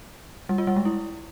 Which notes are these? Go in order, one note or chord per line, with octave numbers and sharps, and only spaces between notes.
G3
F4
G3
G#3
E4